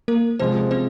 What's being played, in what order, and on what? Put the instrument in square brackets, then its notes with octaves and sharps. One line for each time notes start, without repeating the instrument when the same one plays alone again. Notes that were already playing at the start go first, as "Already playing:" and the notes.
[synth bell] A#3 A#4
[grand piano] C3 F3 G#3 [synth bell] C4 C5
[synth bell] C4 C5